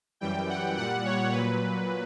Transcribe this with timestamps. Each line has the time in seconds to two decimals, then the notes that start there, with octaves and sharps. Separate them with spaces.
0.21 F#2 E3 G3 G5
0.49 F#5
0.77 A#2 G3 F#5
1.05 C#5
1.32 A#2 F#3 B4